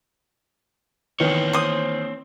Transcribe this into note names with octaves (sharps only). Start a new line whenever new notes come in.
D#3 E3 B3 C4 C#5
C5 D#6